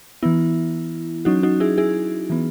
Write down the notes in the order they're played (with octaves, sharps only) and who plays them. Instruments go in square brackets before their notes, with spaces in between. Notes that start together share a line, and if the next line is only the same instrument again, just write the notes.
[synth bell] E3 B3 E4
F#3 C#4 D#4 F#4
D#4 F#4
E4 G#4
E4 G#4
E3 B3